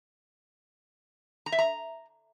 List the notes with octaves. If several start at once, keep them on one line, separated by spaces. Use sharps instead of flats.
A#5
E5
A#5